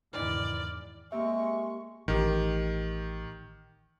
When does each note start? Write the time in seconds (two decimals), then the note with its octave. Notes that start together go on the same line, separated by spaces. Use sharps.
0.13 F#1 E2 G#2 D#3 E3 D5 F6
1.12 G#3 A#3 C4 G4 E5 C#6
2.08 A1 D#3 G4